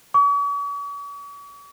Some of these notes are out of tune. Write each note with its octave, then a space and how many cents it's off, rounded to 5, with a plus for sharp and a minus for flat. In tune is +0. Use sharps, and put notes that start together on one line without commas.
C#6 +45